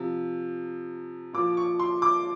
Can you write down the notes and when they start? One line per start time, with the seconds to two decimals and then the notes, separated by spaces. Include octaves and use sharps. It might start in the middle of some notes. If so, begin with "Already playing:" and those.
Already playing: C3 F3
1.33 A#2 F3 D6
1.57 C#6
1.79 C6
2.02 D6